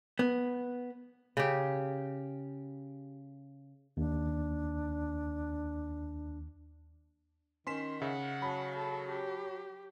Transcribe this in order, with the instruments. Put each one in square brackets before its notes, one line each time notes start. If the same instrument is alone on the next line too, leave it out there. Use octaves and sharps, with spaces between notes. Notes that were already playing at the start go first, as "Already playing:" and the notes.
[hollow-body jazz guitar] B3
[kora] C#3 G4
[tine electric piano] D#2 [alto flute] D4
[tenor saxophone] D#3 [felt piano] C#4 [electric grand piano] C6 B6 E7
[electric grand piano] C#3 [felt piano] E5 [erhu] F#5
[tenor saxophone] F#3 [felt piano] A5 B5
[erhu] A4
G4